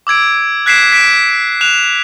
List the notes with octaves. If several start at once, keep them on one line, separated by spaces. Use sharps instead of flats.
D6 E6 G#6 D7
F#6 G#6 B6 C7 D7 E7
B6 D7 E7
F#6 E7 F7